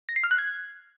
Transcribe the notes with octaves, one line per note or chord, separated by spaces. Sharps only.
A#6
C7
F6
F#6
G#6